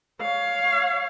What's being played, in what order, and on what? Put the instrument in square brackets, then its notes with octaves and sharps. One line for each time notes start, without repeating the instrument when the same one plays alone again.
[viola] C#5 F5